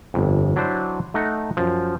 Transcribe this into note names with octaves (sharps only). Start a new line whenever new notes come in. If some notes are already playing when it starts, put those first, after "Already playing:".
G1 F2
F#3 D4 E4 C5
A3 D#4 F#5 A#5
F#2 F3